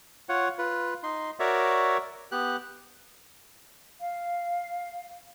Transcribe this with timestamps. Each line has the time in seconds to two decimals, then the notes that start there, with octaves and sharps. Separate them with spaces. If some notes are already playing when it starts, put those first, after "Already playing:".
0.29 F4 C#5 F#5
0.58 F4 B4
1.03 D#4 C6
1.40 F#4 A#4 C#5 D5 E5
2.32 B3 G4 F#6
4.00 F5